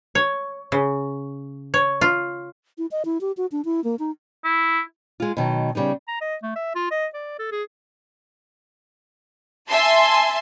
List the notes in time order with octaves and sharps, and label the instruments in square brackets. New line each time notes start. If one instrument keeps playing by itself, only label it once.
[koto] C#5
C#3
C#5
F4
[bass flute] E4
D#5
E4
G4
F#4
D4
E4
A#3
D#4
[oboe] E4
[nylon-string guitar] G#3 F4
B2 D#3 F#3
C#3 G3 B3 D#4
[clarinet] A#5
D#5
A3
E5
F4
D#5
D5
A4
G#4
[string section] E5 G#5 A5 C6